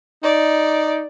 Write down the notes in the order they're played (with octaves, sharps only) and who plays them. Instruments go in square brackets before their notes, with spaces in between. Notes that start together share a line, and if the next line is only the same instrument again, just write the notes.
[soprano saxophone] D#4 [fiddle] D5